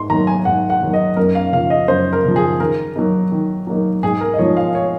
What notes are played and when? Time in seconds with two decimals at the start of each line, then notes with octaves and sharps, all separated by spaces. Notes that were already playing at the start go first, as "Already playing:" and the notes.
Already playing: G#2 C6
0.10 D#3 F#3 A#3 D#4 A#5
0.27 G#5
0.45 G#2 F#5
0.70 F#5
0.81 D#3 F#3 A#3 D#4
0.93 D#5
1.17 F#2 A#4
1.35 F5
1.53 C#3 F3 F5
1.70 D#5
1.88 F#2 C5
2.13 A#4
2.25 C#3 F3
2.36 G#4
2.60 D#3 A#4
2.96 F#3 A#3 D#4
3.32 D#3
3.67 F#3 A#3 D#4
4.03 G#2 G#4
4.21 A#4
4.34 D#5
4.39 F3 G#3 D#4 C#5
4.57 F5
4.75 C#5